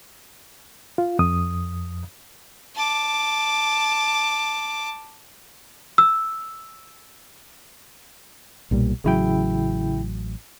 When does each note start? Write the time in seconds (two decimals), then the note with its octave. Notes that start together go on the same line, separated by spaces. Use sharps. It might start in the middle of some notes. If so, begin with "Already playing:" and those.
0.98 F4
1.19 F2 D#6
2.76 A5 D6
5.98 E6
8.71 B1 A#2 G3
9.04 A1 C#3 F#3 E4 G5